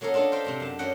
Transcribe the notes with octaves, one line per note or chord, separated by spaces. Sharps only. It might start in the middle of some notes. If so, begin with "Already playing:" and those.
F#3 A#3 C#4 A4 A#4 D#5
D4 F4 A4 A#4 D#5
C5 E5 F5 G5
C3 C4 A#5
F#2 A5
F#2 C#4 D5 D#5 F#5 G5